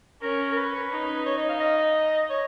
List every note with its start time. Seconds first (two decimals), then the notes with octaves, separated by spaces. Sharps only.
0.22 C#4 A#4
0.52 A#4
0.57 B4
0.92 D#4
1.26 C#5
1.38 D#5
1.49 F5
1.60 D#5
2.30 C#5